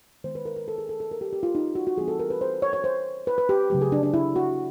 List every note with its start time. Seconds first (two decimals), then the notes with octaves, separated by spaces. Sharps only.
0.24 D#3 G#3 B3 C5
0.35 B4
0.45 A#4
0.56 A#4
0.68 A4
0.78 G#4
0.89 A4
1.00 A4
1.12 A#4
1.21 G4
1.33 G4
1.43 F4
1.55 D#4
1.75 F#4
1.87 F#4
1.97 E3 G3 C4 G#4
2.08 A4
2.20 A#4
2.30 B4
2.41 C5
2.62 C#5
2.73 C#5
2.84 C5
3.27 B4
3.38 B4
3.49 G4
3.70 C#3 F#3 A3 G4
3.81 G#4
3.92 D4
4.03 D4
4.14 E4
4.36 F#4